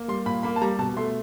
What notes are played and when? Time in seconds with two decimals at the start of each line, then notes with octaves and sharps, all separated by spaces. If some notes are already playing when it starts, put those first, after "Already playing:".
Already playing: A#3
0.08 G3 C6
0.26 A#2 B5
0.43 A#3 B5
0.56 A5
0.61 G3 A#5
0.78 B2 A5
0.97 A3 C6